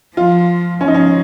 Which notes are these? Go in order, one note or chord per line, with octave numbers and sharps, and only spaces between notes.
F3 F4
F3 C#4
D#4
C#4